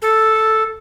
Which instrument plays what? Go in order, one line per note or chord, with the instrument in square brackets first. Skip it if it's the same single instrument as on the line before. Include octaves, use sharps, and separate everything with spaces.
[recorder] A4